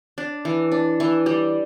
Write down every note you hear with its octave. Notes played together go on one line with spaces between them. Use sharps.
D4
E3
D4
E3
G3